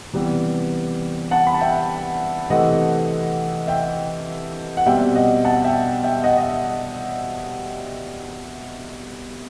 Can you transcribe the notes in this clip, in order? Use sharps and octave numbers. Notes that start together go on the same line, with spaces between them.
C3 E3 G3 B3
F#5 A5
B5
A5
E5 G5
C3 E3 A3 C4 D#5 F#5
E5 G5
F#5
B2 G3 C4 E5 G5
D#5 F#5
F#5 A5
E5 G5
E5 G5
D#5 F#5
D#5
E5